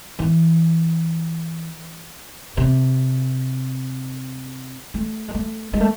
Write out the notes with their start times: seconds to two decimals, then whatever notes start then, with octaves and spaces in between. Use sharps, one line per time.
0.19 E3
2.57 C3
4.94 A3
5.28 G#3
5.35 A3
5.73 G#3
5.81 A3